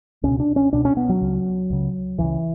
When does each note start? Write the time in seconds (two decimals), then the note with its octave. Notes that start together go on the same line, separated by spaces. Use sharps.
0.23 C#2 B2 C#4
0.40 D4
0.56 C#4
0.73 C#2 B2 D4
0.85 C#4
0.97 B3
1.09 F#3
1.21 C#2 C#3
1.70 C#2 C#3
2.18 C#2 C#3 E3